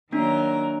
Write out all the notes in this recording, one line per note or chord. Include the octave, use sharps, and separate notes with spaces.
D#3 F#3 A#3 D4 A#4